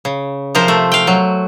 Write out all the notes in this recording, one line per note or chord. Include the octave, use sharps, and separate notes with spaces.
C#3
C3 F3 A#4 C5
A3
F5 G5
F#3